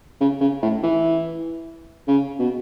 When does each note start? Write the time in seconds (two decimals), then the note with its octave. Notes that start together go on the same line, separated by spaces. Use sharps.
0.21 C#3
0.41 C#3
0.62 A2
0.83 E3
2.07 C#3
2.39 B2